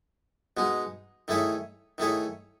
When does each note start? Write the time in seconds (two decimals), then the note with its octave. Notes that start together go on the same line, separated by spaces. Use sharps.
0.57 B2 G#3 D#4
1.28 D#3 A3 E4 G#4 C#5
1.98 D#3 A3 E4 G#4 C#5